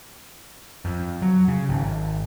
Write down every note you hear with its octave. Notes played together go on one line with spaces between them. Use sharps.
F2
F#3
C#3
G#1